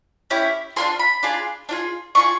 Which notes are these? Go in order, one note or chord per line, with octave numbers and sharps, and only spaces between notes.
C#4 E4 G4
D4 F4 G#4 C6
B5
D4 F4 G#4
D4 F4 G#4
D4 F4 G#4 C#6